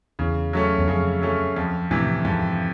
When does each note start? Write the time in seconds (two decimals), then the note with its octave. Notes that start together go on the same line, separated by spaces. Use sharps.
0.19 E2 C#3
0.53 F#3 A3 C#4
0.78 E2
0.88 F2 C#3
1.22 F#3 A3 C#4
1.57 F2
1.91 A2 C3 E3
2.25 F2 G#2